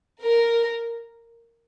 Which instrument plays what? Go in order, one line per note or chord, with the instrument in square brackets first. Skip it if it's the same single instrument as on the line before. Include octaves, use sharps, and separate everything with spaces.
[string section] A#4